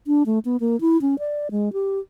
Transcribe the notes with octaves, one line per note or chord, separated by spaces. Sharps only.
D4
A3
B3
A#3
E4
C#4
D5
G#3
G4